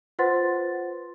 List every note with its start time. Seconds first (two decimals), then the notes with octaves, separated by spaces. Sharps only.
0.19 F4 B4 C5 F#5 C6 A6